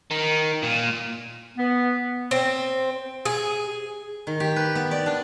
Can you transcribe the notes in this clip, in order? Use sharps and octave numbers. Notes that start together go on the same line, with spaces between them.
D#3
A#2
B3
C4
G#4
D#3
G4
B4
B3
D5
D4